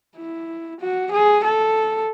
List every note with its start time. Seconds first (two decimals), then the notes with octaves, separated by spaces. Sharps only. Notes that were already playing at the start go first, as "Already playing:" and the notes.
0.16 E4
0.80 F#4
1.11 G#4
1.44 A4